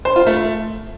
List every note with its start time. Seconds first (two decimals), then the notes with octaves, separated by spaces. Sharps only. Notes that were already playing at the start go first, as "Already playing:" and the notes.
0.05 C5
0.16 F4
0.27 A3